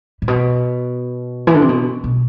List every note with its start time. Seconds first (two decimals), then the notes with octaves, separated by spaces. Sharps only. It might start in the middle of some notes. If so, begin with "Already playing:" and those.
0.22 A2
0.28 B2
1.47 E3
1.54 D3
1.62 C3
1.69 B2
2.04 B2